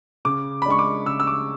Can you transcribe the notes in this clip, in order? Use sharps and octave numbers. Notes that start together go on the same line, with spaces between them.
C#3 D6
B5
G#3 D4 C#6
D6
C#3 E6
E6
D6